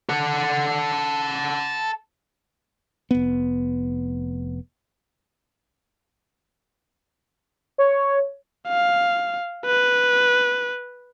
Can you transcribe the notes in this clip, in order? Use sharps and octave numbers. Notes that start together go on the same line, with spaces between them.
A4 F#5
F1 B3
C#5
F5
B4